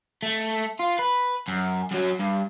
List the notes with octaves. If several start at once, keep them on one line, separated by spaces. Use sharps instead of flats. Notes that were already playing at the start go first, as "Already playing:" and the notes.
A3
F4
B4
F#2
F#2 F#3
G2